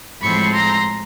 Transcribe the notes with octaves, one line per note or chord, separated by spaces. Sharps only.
A2 F3 G#3 C4 B5 C#6
A#5 C6